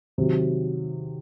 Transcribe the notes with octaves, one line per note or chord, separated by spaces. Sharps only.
C3 D#3 F#3